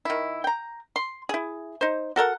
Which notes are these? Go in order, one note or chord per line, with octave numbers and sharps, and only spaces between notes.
D#3 E4
G5 A#5
C6
E4 G#4
D#4 C5
F#4 A4 A#4 F#5